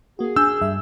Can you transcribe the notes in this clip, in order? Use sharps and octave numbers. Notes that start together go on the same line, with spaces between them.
A#3 F#4 G#4
D4 G#5 E6 G6
G2 E5